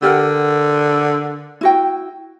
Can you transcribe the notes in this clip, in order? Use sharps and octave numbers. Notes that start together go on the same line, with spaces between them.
D3 G4 A#4 F#5
E4 F#4 G5